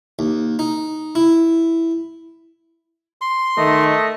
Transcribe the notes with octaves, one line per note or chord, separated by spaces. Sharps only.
D#2
D#4
E4
C6
D#3 A3 D#5